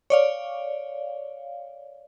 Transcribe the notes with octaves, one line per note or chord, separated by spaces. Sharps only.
C#5 D5 F5